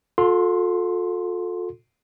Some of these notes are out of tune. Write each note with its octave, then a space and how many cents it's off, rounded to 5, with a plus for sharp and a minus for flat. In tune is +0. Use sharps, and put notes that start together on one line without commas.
F4 +45 A4 +0 C6 +0